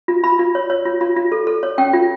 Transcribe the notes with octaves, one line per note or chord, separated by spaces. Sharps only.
F4
F4 B5
F4
C#5
C#5
F4
F4
F4
A4
A4
C#5
C#4 G5
F4